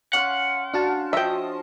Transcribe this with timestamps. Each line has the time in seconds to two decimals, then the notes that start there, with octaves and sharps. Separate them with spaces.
0.13 C#4 F5 F#5 C6
0.74 D4 F#4 F5 A5
1.13 F3 D#5 E5 G5 D#6